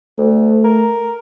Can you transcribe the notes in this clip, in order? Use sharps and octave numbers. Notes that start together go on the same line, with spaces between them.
D2 A3
A#4